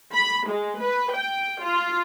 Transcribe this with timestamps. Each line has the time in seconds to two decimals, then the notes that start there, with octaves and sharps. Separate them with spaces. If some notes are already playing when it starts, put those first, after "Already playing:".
0.14 B5
0.50 G#3
0.81 B4
1.14 G5
1.63 F4